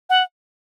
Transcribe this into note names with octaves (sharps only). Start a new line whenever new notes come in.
F#5